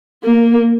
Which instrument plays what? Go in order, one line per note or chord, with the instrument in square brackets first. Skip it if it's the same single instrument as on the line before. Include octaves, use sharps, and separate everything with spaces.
[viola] A#3